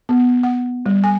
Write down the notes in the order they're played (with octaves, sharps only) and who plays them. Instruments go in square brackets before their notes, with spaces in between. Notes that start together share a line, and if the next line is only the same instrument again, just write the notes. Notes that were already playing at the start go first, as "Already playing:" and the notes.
[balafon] B3
F#5
G3
G#5